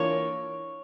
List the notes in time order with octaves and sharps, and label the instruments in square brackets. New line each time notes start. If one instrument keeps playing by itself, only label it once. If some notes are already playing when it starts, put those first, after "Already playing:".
Already playing: [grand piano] E3 A#3 D4 F4 A#4 [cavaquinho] C#5